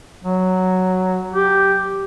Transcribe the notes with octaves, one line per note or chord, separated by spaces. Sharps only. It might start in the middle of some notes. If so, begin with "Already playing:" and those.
F#3
G4